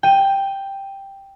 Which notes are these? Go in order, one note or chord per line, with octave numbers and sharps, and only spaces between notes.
G5 D#7